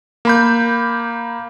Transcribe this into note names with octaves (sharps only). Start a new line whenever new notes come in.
A#3 B5 G6